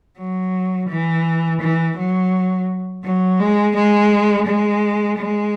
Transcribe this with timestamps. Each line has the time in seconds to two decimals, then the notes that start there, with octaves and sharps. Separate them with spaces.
0.18 F#3
0.89 E3
1.60 E3
1.97 F#3
3.04 F#3
3.39 G#3
3.75 G#3
4.47 G#3
5.18 G#3